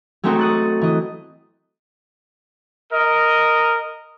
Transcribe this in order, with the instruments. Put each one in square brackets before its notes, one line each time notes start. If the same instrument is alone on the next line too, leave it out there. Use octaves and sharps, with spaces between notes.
[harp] F#3 G#3 A3 C4 D#4 F#4
D#6 F#6 A6
E3 D#5
[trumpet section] A#4 D#5